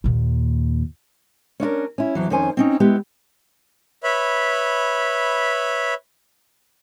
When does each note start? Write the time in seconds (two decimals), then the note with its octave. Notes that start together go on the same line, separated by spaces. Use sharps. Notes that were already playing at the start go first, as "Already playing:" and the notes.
0.04 D#2 A#2
1.60 C#4 D4 E4 A#4
1.98 C#4 E4
2.15 F2 E3 F#3
2.30 F2 D#3 C#4 C5 G#5
2.57 C4 C#4 D#4
2.80 G#3 B3 E4 G4
4.04 B4 C#5 E5 B5